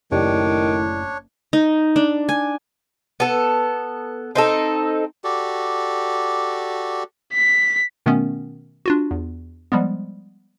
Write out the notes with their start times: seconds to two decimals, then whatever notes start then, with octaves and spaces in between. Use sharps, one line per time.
0.11 F#1 A2 D#3 D4 G4 C#5 D5
1.53 D#4
1.96 D4
2.29 G#5
3.20 B3 A4
4.35 C4 D#4 A4
5.24 F#4 G4 A4 D5
7.33 B6
8.06 B2 D#3 A3 B3 C#4
8.86 D4 F4 F#4
9.11 E2
9.72 F3 G3 G#3 B3